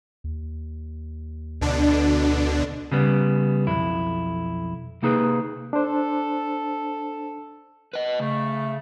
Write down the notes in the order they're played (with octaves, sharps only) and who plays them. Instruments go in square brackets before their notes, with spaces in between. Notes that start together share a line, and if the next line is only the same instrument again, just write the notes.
[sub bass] D#2
[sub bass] D2 [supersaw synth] B2 D3 D4
[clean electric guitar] C#3 G3 B3
B1 F2 E4
C3 A#3 D#4 G#4 B4
[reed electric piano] D4 C5 [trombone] A4
[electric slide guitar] B4 D#5
[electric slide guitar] C#3 [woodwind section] A3